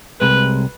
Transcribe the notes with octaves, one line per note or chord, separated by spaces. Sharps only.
C2 C3 G#3 B4